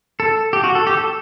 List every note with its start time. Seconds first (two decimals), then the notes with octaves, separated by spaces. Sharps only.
0.20 A4
0.53 G4
0.64 F#4
0.75 A4
0.87 G4
0.97 A4